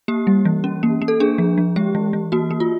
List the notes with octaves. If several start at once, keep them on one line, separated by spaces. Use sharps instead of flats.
A#3 G4
G3
E3
C#4
A#3
A#3
A4
D4 G#4
F3
F3
G#3 G4
E3
E3
A#3 F#4
A#3
F4